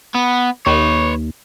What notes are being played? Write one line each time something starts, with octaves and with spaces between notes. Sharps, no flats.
B3
D#2 B4 C#5